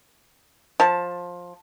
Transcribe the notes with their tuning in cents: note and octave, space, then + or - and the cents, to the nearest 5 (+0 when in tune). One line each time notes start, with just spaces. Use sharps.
F3 +15 A5 +0